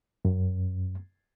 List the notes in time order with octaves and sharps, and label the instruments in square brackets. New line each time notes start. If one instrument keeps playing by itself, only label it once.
[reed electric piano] F#2